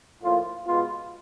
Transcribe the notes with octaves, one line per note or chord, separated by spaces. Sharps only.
A2 F3 A#3 F4
B2 G#3 B3 F4